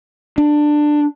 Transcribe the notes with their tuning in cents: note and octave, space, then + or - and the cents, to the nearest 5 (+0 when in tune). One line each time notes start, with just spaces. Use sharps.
D4 +15